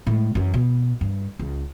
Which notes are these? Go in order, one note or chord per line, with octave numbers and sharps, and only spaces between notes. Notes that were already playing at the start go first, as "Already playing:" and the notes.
A2 G#3
F#2 E3
B2
G2
C#2